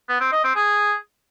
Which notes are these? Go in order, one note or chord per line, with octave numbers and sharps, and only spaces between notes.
B3
C4
D#5
C4
G#4